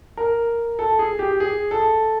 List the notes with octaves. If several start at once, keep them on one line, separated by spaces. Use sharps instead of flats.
A#4
A4
G#4
G4
G#4
A4